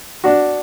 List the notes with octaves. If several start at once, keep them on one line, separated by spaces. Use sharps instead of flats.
D4 F#4